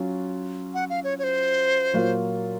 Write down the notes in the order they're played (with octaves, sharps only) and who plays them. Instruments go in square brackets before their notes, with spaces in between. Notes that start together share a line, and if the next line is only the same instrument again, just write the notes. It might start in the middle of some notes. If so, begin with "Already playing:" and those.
Already playing: [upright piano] F#3 C#4 F4
[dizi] F#5
F5
C#5
C#5
C5
[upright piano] A#2 F#3 A#3 F4